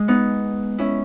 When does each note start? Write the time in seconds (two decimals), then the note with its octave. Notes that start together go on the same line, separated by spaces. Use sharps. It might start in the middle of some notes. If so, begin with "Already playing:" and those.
Already playing: G#3
0.08 B3 D#4
0.78 C#4 E4